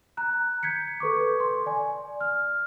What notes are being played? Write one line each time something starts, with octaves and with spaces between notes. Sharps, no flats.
A#5 F#6
G6 G#6 B6 C#7
A4 B4 C#6 D6
C6
D5 G#5
F6